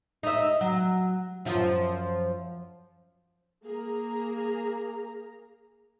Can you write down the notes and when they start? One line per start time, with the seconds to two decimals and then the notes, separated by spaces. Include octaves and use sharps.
0.23 D#4 E5
0.61 F#3
1.45 F#2 F3
3.64 A#3 G#4 A#5